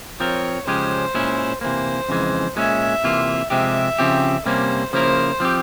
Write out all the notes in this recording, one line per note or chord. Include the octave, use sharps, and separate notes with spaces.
F3 C4 F4 A#4 C#5
C#3 F3 G#3 C#4 G4 C5
A#2 G#3 C#4 E4
C3 E3 A#3 C5
F2 C#3 E3 G#3
A#2 G#3 C#4 E5
C3 E3 A#3 F4
C3 F3 G#3 C4 G4 E5
C#3 F3 C4 G4
C3 G3 A#3 C#4 C5
C#3 F3 A#3 E4 A#4 C5
F3 C4 G4